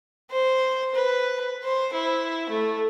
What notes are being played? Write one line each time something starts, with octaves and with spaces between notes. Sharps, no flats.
C5
B4
C5
E4
A3